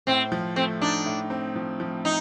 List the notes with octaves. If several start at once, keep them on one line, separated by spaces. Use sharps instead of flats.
A2 C4
F3
A3 C4
D4 D#4
A2
C4
F3
F3
D#4